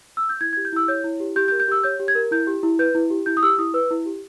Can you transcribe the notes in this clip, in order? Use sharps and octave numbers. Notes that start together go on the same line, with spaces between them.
E6
G6
E4 G#6
G#6
G4
G6
E4 E6
C#5 G6
E4
G4
G4 G6
G6
A#4
G6
G4 E6
C#5 G6
G4
G#6
A#4
E4 G6
G4
E4
B4 G6
E4
G4
E4 G6
D#6
G4 E6
E4 D#6
B4 E6
E4
G4